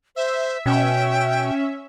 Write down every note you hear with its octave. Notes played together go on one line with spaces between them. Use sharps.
C5 E5
B2 C#4 E5 G5